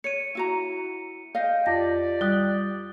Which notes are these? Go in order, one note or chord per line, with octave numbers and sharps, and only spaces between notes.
C#5 C#7 D#7
E4 F#4 A#5
D#5 F5 G5
F2 G4 D5 A#6
G3 D#6 F#6 G7